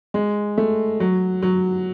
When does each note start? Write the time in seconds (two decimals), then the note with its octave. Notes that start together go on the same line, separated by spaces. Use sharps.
0.14 G#3
0.58 A3
1.00 F#3
1.42 F#3